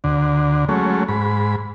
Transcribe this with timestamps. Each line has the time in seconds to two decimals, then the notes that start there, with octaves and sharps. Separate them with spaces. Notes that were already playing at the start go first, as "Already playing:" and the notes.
0.04 D2 D3
0.69 F#3 G#3 A3 C#4
1.08 G#2 B5